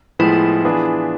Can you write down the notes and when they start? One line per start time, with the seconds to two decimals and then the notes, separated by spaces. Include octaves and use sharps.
0.19 A2 F3 G#3 B3 E4
0.65 E3 B3 D4 F4 G#4